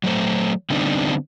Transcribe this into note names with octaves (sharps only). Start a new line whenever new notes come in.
F#3 A3 C5
D3 G3 B3 C4 D4 D#4